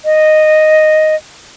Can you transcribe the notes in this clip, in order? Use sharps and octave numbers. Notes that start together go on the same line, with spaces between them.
D#5